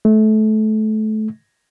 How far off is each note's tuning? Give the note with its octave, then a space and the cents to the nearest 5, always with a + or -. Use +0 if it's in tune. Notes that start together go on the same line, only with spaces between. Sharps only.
A3 -25